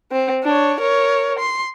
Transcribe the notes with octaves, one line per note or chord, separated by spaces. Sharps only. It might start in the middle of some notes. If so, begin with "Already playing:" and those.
C4
D4 C#5
A#4 C#5
C6